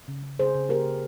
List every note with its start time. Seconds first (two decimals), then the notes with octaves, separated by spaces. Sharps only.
0.08 C#3
0.23 C#3
0.39 C#3 G#4 C5
0.55 C#3
0.69 A#3 G4 A#4
0.85 C#3